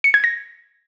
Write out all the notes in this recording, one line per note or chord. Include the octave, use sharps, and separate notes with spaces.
C#7
G#6
A#6